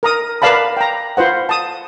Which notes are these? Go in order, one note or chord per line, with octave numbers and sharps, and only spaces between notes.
A#4 A#5 D#6
A#4 B4 D5 F5 A5 B5
G5 A#5
F4 B4 C5 F#5
A5 D#6